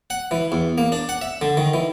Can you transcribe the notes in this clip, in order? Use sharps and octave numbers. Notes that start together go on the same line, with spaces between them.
F#5
E3
E2
A#3
D4
F#5
E5
D3
D#3
E3